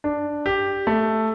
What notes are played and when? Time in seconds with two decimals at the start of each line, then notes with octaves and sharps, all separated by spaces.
0.04 D4
0.46 G4
0.87 A3